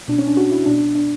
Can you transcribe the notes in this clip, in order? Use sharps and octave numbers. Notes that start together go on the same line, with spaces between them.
B2 D4
C#4
D4
F#4
E4
B2 D4
D4